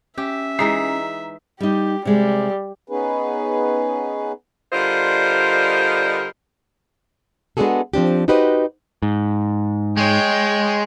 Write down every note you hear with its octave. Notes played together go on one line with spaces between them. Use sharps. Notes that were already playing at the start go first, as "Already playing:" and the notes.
C#4 G4 E5
E3 G#3 D#4 A#5 B6 C7
G3 D#4 G4
C3 G3 G#3
B3 C#4 D#4 G#4 B4
D3 G3 F4 A#4 C5 D#5
G#3 B3 D4 F#4 G#4 A4
F3 C4 D4 G4
D#4 F#4 G4 B4 C5 D#5
G#2
G#3 C#5 G5